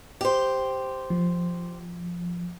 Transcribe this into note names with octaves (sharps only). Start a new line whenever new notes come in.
G4 C5
F3